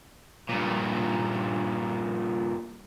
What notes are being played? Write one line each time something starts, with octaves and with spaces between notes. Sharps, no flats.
G2 A#2